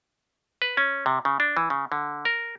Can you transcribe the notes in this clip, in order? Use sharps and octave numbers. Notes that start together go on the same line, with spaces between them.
B4
C#4
C3
C#3
D4
E3
C#3
D3
A#4